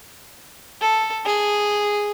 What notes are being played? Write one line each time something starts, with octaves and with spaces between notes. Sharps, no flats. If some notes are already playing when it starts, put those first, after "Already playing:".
A4
G#4